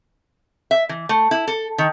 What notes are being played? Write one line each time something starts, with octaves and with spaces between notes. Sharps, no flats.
E5
E3
A3
E4
A4
D#3